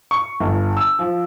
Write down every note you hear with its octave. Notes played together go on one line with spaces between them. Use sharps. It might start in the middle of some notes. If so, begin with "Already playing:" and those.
C#6
G1
E6
F3